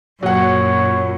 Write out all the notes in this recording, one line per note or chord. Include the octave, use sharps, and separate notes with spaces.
F#2 A#2 F#3 C#5 F#5